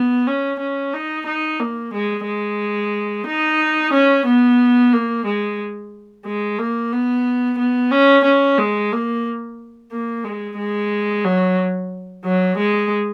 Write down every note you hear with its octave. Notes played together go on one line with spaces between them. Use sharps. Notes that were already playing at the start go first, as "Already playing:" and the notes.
Already playing: B3
C#4
C#4
D#4
D#4
A#3
G#3
G#3
D#4
C#4
B3
A#3
G#3
G#3
A#3
B3
B3
C#4
C#4
G#3
A#3
A#3
G#3
G#3
F#3
F#3
G#3